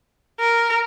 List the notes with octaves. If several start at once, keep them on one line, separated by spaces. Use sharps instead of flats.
A#4